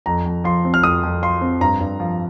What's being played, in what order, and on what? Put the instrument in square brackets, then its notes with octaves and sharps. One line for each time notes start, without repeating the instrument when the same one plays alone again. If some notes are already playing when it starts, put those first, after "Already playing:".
[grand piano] F2 A#5
F2
F3 C6
C4
F6
F2 D#6
F2
F3 C6
C4
G2 A#5
G2
F3